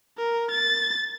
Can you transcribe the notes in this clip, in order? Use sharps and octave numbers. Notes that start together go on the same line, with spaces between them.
A#4
A6